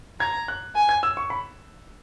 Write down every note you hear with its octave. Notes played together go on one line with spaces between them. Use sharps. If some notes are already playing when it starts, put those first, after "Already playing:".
A#5 G#6
F#6
G#5
G#6
E6
C#6
B5